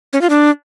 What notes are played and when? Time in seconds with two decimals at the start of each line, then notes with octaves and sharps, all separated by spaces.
0.13 C#4
0.21 F4
0.30 D4